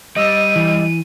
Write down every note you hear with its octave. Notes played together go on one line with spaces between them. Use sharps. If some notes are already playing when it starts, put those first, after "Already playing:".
G3 D#5 E6 D#7
E3